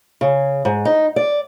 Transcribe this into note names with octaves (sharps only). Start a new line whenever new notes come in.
C#3
G#2
D#4
D5